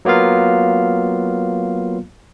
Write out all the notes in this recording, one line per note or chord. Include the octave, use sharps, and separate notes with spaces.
F#3 A#3 B3 F4 F5